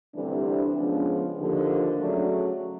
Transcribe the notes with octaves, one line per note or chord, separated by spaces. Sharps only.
D2 C3 E3 G3 C4 D4
D4
C#3 F3 G#3 B3
D#2 D3 F3
C#3 F#3 A3 D4